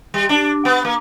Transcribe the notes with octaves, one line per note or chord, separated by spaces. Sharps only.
G3
D4
B3
A#3